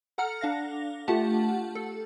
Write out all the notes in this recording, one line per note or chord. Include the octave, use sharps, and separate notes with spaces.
A4 F#5 A#5 F6 C#7
D4 F5 A#6
A3 F4 G4 F#5 A5
A4